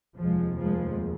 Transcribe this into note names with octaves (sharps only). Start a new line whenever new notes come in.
F1 D#2 F3 G#3
F3 G#3